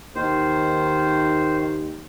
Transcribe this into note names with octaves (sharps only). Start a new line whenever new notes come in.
D#2 D#3 C5